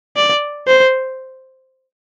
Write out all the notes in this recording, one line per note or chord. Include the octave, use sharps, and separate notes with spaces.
D5
C5